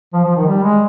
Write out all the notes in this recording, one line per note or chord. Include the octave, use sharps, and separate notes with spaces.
F3
F3
D#3
G3
G#3